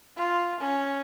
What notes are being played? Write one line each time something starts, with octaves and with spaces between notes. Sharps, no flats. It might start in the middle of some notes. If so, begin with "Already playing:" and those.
F4
C#4